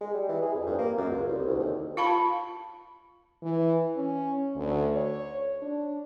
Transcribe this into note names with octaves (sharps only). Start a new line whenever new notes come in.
G#3
G3
E3
G#4
F2
G2
A#3
F#2
C#2
C2
D2
D#2
F4 F5 A5 B5
E3
C#4
D2
C#5
D4